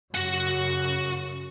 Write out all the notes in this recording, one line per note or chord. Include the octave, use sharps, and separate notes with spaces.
F#2 C#3 F#4 F#5